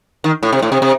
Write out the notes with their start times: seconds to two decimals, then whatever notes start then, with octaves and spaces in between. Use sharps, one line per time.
0.24 D#3
0.43 A2
0.52 C3
0.62 A2
0.72 C3
0.82 C3